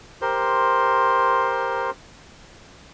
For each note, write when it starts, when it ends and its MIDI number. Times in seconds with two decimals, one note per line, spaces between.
0.21 1.90 67
0.21 1.90 70
0.21 1.90 72
0.21 1.90 84